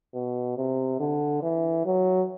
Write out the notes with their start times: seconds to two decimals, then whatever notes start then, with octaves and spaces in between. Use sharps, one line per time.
0.14 B2
0.57 C3
1.00 D3
1.42 E3
1.85 F#3